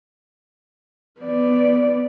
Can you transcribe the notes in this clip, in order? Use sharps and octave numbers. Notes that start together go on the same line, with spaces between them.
B3 D5